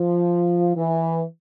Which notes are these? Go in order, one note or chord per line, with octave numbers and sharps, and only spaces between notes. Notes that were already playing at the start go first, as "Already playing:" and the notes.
Already playing: F3
E3